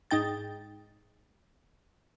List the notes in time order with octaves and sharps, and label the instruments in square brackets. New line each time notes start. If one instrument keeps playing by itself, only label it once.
[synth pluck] G#2 D#4 G5 A6